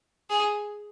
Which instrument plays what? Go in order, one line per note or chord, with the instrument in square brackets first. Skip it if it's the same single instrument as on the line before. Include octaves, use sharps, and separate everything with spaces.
[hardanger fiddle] G#4